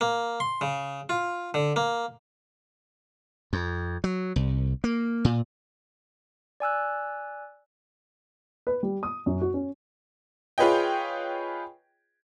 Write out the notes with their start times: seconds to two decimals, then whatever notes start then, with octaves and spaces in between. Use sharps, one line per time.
0.01 A#3
0.40 C6
0.61 C#3
1.09 F4
1.54 D3
1.76 A#3
3.53 F2
4.04 F#3
4.36 C2
4.84 A#3
5.25 A#2
6.60 D5 G#5 E6 F#6
8.67 B4
8.83 G3
9.03 D#6
9.26 F#2
9.41 F#4
9.54 C#4
10.58 F4 G#4 B4 C#5 D#5 G5